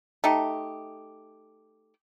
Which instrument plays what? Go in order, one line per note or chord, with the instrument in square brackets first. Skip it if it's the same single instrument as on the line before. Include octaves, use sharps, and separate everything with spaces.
[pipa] A3 D#4 G4